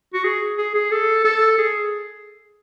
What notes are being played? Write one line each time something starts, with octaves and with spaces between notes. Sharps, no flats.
F#4
G#4
G#4
G#4
A4
A4
G#4